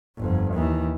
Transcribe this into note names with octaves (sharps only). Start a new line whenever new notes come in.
G1 F2
D#2 E3